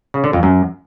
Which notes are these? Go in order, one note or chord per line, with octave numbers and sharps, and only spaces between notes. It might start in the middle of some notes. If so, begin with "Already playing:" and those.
C#3
D3
F2
F#2